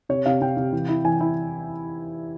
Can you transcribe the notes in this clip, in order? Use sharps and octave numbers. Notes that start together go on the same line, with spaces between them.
C3 C#5
C3 F5
C3 G5
C3
E3
E4
E3 G#5
E4